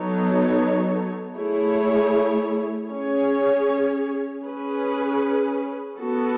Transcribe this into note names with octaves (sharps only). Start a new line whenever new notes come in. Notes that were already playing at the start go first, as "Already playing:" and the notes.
Already playing: F#3 B3 D#4 A4 C#5
A3 E4 G#4 C#5
C#4 G#4 C#5
C#4 G#4 B4
B3 F#4 A4